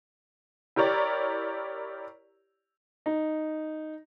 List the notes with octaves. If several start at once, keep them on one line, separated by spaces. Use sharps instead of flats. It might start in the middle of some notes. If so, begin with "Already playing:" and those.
E4 G4 A#4 C#5 D5
D#4